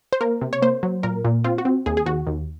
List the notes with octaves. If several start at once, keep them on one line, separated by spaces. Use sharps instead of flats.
C5
A#3 A#4
C3
C#5
A#3 C5
F#3
A#2 A#4
A#2
C4 F4
F#4
C4
D#2 G#4
G#4
D#2 F#4
D#2